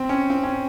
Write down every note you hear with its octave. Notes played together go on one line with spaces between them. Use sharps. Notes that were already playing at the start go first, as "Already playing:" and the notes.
Already playing: C4
C#4
C4
C#4